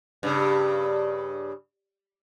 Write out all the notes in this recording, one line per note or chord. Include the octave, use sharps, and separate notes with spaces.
G2 C#3